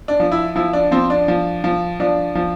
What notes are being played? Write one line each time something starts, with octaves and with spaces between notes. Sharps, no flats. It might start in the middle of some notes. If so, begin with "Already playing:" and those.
D4
F3
E4
F3 E4
D4
F3 C4
D4
F3
F3
F3 D4
F3